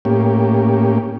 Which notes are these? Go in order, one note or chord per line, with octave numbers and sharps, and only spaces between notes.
A2 A#3 C#4 G4